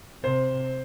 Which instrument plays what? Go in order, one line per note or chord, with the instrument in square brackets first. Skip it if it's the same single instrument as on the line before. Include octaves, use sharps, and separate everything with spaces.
[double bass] C3 [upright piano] C5